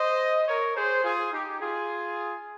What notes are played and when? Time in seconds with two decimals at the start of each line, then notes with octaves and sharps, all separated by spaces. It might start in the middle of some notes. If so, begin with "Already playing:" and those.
Already playing: C5 D#5
0.48 A#4 C#5
0.75 G#4 C5
1.03 F4 G#4
1.32 D#4 G4
1.60 F4 G#4